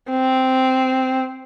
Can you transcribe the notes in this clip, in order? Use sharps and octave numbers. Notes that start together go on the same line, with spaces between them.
C4